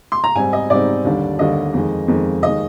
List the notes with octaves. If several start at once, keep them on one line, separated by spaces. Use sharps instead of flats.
C6
A#5
G#2 G3 C4 D#4 G#5
D#5
G#2 G3 C4 D#4 D5
D#2 D3 G3 D4
D#2 D3 G3 D4 D#5
F2 D#3 G#3
F2 D#3 G#3
D#2 D#3 G#3 D#5